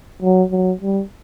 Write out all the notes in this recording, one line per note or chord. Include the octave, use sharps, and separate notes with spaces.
F#3
F#3
G3